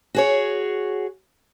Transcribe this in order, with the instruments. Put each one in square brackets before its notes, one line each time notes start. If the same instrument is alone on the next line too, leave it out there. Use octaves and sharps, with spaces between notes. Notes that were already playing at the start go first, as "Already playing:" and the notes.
[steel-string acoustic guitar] F#4 G#4 C#5